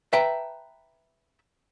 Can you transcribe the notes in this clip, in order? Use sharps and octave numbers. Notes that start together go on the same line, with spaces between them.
B4 E5 G5 A5 A#5